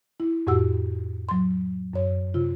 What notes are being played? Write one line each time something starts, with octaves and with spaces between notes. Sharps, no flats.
E4
F2 A2 F#4 G4 F#5 E6
F#3 C6
F#2 C#5
C3 F4